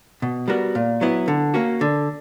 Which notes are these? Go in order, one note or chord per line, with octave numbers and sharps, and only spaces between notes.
B2
G3 B3 F#4 A#4
A#2
F#3 B3 E4
D3
A#3 C#4 F#4
D3